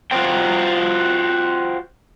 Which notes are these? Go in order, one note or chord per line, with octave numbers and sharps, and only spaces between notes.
F4 F#4 G#4 A4 C5 G5